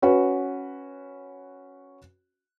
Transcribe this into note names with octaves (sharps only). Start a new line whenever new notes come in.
C#4 F#4 B4